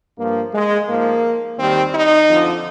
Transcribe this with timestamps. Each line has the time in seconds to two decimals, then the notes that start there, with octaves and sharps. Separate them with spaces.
0.18 G2 F3 A#3
0.53 G#3
0.88 G#2 F3 A#3
1.58 D#2 D#3 G3 C4
1.94 D#4
2.28 F2 D3 F3